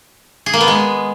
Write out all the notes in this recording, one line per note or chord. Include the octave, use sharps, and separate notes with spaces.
G#4
A#3
B3
G#3